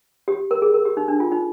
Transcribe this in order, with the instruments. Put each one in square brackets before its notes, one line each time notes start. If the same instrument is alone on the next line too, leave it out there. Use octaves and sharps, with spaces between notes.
[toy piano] G4
A#4
G#4
A#4
G4
D#4
D4
F4
D#4